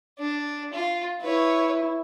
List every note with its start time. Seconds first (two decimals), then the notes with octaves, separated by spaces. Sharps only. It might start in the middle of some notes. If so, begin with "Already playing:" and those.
0.18 D4
0.73 F4
1.21 E4 B4 C#5